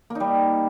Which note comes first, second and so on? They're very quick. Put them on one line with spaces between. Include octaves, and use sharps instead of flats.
A#3 D#4 G3